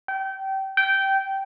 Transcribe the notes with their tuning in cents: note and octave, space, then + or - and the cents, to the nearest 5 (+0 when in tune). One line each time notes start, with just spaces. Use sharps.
G5 -25
G5 -15